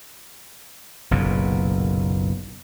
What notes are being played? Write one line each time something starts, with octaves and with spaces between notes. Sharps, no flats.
F#1 B1 F#2 A#2